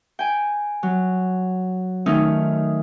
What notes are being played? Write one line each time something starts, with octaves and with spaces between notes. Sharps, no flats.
G5 G#5
F#3
D#3 A3 C#4 D#4